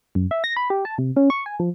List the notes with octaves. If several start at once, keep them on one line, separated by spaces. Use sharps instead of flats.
F#2
E5
A#6
B5
G4
A5
C3
C#4
C#6
G#5
F3